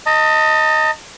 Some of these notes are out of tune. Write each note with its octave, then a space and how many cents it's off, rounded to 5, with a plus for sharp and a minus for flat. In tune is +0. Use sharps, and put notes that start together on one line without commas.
D#5 +5 A5 +40